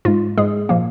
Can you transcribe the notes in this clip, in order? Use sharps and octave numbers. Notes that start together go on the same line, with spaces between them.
G#2 G#3 F4
G#2 G#3 G#4
A#2 F3 A#3